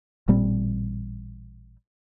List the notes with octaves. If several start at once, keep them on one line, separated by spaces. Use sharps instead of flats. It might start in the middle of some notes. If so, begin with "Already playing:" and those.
A1 A#2 G3 C4